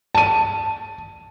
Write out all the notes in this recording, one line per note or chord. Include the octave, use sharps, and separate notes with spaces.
A5 D#7